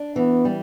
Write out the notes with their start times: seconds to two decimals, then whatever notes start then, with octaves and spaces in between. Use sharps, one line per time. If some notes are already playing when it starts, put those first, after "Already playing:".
Already playing: D4
0.16 E3 B3
0.45 G3